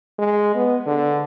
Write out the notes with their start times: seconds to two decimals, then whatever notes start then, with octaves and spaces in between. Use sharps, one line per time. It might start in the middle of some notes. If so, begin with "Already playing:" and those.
0.19 G#3
0.55 B3
0.86 D3